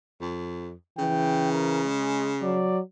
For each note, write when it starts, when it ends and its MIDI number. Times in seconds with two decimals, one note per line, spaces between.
0.20 0.73 41
0.98 2.77 49
0.98 1.85 52
0.98 1.50 79
1.52 1.81 70
1.84 2.34 56
2.42 2.80 54
2.42 2.79 74